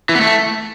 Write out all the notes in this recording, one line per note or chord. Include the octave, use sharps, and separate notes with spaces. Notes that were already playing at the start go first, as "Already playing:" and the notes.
E3
B3
A3